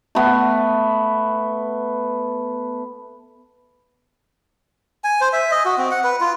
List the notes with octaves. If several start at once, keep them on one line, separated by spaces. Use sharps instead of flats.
A3 B3
G#5
C5
E5
D#5
F#4
C4
F#5
B4
F4